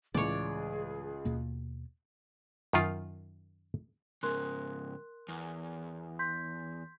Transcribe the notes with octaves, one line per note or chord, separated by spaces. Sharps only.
C#2 A2 E3 G#4 C#5 D5
D#2 B2 A#3
F#2 D#3 F4
G#2 C#3 A#4 C6 F#6
E2
C6 G6 B6